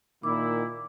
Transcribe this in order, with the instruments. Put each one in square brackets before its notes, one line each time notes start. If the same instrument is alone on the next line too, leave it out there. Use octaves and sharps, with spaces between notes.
[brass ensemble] A#2 D#3 E4 [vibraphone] D6